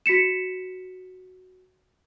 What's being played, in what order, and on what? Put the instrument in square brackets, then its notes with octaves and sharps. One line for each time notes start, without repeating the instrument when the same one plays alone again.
[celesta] F#4 B6 C#7 E7